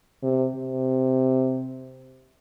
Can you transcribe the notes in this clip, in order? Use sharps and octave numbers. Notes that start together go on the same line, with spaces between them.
C3
C3